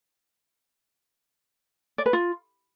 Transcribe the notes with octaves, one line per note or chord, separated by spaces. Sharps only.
D5
B4
F4